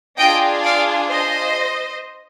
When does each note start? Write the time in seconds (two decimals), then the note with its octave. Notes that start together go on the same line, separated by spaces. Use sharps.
0.18 D4 F4 G#4 D#5 G5
0.64 D5 F5
1.10 C5 D#5